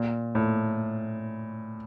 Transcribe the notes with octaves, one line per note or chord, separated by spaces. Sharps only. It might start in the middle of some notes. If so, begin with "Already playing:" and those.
Already playing: A#2
A2